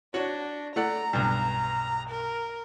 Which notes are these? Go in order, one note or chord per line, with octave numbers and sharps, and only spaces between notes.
D4 F#4 C#5
A3 D5 F#5 A#5
B1 G2
A#4